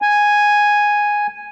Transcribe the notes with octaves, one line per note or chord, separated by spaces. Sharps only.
G#5